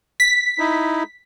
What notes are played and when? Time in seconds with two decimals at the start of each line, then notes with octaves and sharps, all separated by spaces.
0.20 B6
0.59 D#4 E4